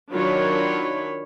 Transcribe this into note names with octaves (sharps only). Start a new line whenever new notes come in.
D#3 F#3 D4 F4 C#5 B5